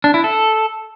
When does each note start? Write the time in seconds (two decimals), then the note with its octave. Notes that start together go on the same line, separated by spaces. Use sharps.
0.04 D4
0.14 E4
0.24 A4